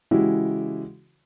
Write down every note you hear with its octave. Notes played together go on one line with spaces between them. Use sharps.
C#3 E3 G#3 E4 F#4 G4